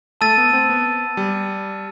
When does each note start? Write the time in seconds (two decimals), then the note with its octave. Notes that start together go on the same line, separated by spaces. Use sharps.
0.21 A3 A5 E6 A6 D#7
0.38 B3
0.53 C4
0.70 B3
1.17 G3